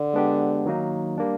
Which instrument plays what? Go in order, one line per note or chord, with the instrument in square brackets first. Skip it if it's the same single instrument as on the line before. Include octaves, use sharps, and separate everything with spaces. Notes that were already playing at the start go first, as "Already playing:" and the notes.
Already playing: [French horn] D3
[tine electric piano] G#3 B3 D4 G4
D#3 F#3 A#3 D#4
G3 A#3 D4